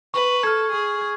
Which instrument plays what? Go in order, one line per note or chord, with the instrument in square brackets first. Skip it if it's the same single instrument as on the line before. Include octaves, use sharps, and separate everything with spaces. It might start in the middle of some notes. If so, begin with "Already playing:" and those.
[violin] B4 [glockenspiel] C#6
[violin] A4 [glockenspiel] F6 G#6
[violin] G#4 [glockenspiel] C#6
[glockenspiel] G#6